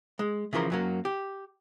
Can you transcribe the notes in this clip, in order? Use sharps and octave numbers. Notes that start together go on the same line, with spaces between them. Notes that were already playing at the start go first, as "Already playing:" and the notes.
G#3
C#3 E3 F3 A#4 C6
F#2 F#3 A#3
G4